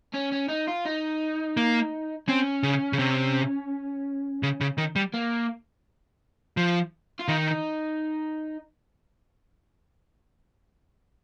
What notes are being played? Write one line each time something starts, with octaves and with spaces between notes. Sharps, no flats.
C#4
C#4
D#4
F4
D#4
A#3
C4 C#4
C#3
C#3
C3
C#3
C#3
D#3
G3
A#3
F3
F4
D#3 D#4